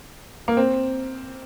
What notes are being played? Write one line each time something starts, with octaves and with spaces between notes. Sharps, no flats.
A#3
C4